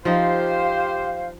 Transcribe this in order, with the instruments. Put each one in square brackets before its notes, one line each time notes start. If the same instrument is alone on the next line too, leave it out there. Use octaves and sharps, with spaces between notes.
[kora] F3 D#4 [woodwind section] G4 C5 [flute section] F5